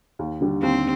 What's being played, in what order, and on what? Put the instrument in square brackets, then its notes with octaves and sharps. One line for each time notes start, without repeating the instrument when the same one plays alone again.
[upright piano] D#2
D3 G3
[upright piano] D#2 [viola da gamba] C4